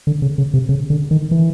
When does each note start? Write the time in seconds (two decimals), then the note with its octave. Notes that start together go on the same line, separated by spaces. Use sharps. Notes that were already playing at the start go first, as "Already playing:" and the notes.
0.07 D3
0.22 C#3
0.38 C#3
0.54 C3
0.69 C#3
0.90 D3
1.11 D#3
1.31 E3